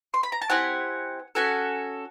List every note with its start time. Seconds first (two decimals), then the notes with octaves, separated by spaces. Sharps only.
0.14 C6
0.23 B5
0.32 A#5
0.42 A5
0.50 C4 E4 G4 F#5 G#5
1.35 C#4 F#4 A4 F#5 G#5